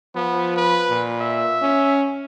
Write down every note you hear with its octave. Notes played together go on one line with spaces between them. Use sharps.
F3 B3
B4
A#2
E5
C#4